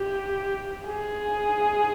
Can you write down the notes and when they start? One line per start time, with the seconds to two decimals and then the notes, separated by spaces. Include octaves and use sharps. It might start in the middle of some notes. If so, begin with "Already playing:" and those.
Already playing: G4
0.86 G#4